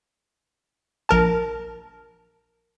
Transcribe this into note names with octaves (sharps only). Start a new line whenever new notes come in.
A#1 A#4 A5